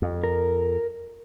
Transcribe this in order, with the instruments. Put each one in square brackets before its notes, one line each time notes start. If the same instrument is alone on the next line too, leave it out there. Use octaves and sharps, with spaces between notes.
[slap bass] F2
[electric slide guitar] A#4